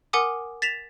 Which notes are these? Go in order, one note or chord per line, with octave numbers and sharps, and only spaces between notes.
A#4 F#5 G#5 D6 D#6
A6 B6 E7 F7